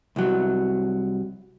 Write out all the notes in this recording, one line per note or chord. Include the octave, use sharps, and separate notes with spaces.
C2 F#3